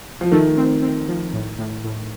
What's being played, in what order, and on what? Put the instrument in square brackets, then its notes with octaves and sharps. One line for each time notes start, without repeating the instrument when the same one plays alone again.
[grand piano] F3
[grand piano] D#3 [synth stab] A3
[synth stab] C4
C4
F3
A2
A2
A2